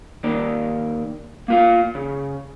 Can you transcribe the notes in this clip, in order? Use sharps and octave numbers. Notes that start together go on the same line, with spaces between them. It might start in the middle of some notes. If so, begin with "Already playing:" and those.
D#3 A#3 D5
A#3 F4 F5
C#3